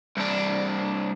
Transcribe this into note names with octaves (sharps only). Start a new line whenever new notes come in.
C2 D4